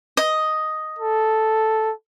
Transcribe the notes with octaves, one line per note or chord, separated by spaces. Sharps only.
D#5
A4